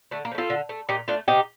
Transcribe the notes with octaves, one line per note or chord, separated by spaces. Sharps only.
D3 A3
A#3
F3 A3
F4 A4
D3
A3
A#2 D#4 G4
A3 D4 F4
C3 D#4 G4